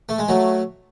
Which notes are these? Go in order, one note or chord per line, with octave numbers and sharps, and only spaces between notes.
A3
G#3
F#3 A3